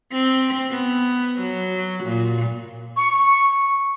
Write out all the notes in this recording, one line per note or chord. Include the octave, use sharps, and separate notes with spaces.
C4
B3
F#3
A#2
C#6